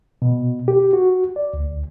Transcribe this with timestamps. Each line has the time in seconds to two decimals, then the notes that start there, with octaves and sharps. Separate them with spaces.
0.22 B2
0.68 G4
0.93 F#4
1.36 D5
1.54 D2